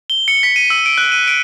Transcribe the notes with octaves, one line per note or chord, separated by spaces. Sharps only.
G7
C#7
B6
D#7
E6
D7
F#6
D#7
D7